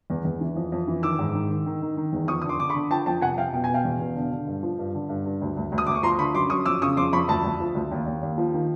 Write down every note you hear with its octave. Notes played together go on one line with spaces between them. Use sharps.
E2
E2
E3
F2
F2
E3
D#3 D6 E6
G#2
D#3
D#3
D#3
D#3
D#3
E2
F2 C#6 D#6
D3 D#6
C6 D6
D3 D6
B5 C#6
D3
F3 G5 A5
F2 G5 A5
C3 F#5 G#5
F2 F5 G5
B2 G5
B2 G#5
F5 G5
E2
B2
D3
D3
G2
F3
G2
D3
G2
G2
D2
D2
D2
D#6
D2 D6
C#6
F3 A#5 C6
D3 B5 C#6
F#2 C6 D6
F#2 C#6 D#6
F2 D6 E6
C#3 C#6 D#6
F2 C6 D6
F2 B5 C#6
D2 A5 B5
D2
F3
D2
D#2
D#2
D#2
F3
D#3